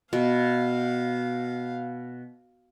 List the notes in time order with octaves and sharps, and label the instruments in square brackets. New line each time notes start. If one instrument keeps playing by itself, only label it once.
[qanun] B2 [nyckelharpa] F5